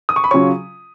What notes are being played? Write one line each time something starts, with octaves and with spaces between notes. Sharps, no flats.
D#6
C#6
B5
C#3 F#3 C#4 F4 C#5 C#6